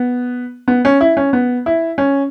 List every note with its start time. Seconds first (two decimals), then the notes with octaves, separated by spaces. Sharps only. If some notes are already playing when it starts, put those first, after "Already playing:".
Already playing: B3
0.68 B3
0.85 C#4
1.01 E4
1.17 C#4
1.33 B3
1.66 E4
1.98 C#4